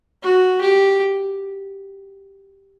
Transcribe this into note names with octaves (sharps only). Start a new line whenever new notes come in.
F#4
G4